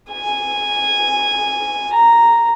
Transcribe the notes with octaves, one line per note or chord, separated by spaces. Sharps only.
G#5
A#5